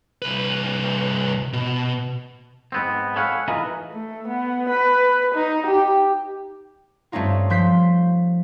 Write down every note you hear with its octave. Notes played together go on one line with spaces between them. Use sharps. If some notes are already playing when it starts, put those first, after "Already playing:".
C2 B4
B2
G#2 B3 C4
A4 C#5 F5 F#5 G#5 B5
E3 D#4 F4 G#4 A#4 B4
A3
B3
B4
D#4
G4
G2 A3 C4 C#4 D#4 F4
F3 C6 G6 B6